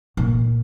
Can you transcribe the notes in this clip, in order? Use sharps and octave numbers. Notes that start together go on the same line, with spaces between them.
A#2